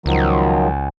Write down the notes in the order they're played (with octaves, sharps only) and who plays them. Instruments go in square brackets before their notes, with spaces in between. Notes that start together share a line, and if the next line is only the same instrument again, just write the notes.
[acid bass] C#2 [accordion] D#3 F3 F#3